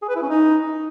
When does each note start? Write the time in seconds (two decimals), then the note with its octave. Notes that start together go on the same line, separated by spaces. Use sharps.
0.02 G#4
0.09 B4
0.16 E4
0.22 C#4
0.29 D#4